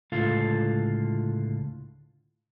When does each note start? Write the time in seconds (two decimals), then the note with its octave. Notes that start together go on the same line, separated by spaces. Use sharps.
0.12 C#2 A2 D3 F4 A4 F5